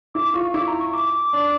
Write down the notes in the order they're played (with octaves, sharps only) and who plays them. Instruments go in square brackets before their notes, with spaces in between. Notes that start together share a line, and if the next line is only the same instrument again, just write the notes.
[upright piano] E4 [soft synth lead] D6
[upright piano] F4 [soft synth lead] C#6
[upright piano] E4 [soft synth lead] D6
[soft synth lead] C#6
A#5
C#6
D6
[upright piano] D4